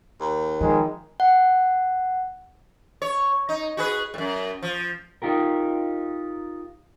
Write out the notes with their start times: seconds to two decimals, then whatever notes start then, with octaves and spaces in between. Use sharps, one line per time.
0.20 D#2
0.61 G#1 D#3 F3 G#3
1.20 F#5
3.02 C#5
3.49 D#4
3.77 F#4 G#4 B4
4.14 F#2 A2
4.62 F3
5.22 D#4 F4 G4 A#4